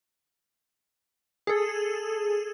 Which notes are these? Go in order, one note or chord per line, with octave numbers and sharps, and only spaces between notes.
G#4 A4